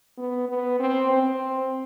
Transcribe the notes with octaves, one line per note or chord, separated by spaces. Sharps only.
B3
B3
C4
C4